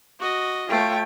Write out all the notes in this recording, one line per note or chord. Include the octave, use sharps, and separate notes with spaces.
F#4 D#5
A3 F4 C#5 G5